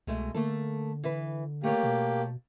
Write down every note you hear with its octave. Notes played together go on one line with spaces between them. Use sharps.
C2 B2 G#3 A3
D3 A3 A#3 A4
E3 B4
A3 A#3 G4 C#5
B2